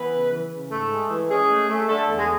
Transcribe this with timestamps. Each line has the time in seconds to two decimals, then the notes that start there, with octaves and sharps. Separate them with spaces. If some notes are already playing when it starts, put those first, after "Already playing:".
Already playing: E3 B3 B4
0.12 C#3
0.32 E3
0.51 C#3
0.71 G#2 A3 A4
0.91 G#3
1.10 E3
1.29 G#3 C#4 G#4
1.49 A3
1.69 A3
1.88 D3 A3 A4
2.08 E2
2.17 G#3 G#4